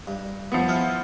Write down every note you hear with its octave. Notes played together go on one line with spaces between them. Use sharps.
G2
F3 B3
E4 G#4 F5